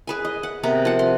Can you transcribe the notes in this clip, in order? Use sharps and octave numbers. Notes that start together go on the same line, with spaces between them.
G#4 B4 G#5
D#5
F#5
C3 B3 A#4
F3 F#5
C6